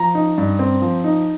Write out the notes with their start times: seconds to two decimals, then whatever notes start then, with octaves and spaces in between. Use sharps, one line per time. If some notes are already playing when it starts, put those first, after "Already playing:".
Already playing: F3 A#5
0.15 D#4
0.38 G2
0.59 C4
0.82 F3
1.04 D#4